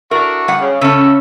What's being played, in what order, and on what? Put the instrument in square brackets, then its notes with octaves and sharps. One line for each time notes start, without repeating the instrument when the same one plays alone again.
[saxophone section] D4 E4 F#4 [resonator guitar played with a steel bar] A#4
[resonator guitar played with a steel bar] G3 F#5
[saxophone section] C#3
[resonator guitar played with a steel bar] C#3 C#4 [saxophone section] A4 E5